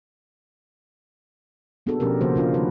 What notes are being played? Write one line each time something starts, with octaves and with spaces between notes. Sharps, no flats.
A#3 B3 D4 F#4 G#4 A4
B2 F3 C#4 D4 G4 A#4
C#3 F3 A#3 F#4 C5
C#4 D4 F4 F5
D#3 G3 D#4 B4